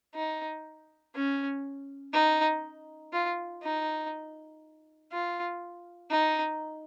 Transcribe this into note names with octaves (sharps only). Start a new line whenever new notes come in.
D#4
C#4
D#4
F4
D#4
F4
D#4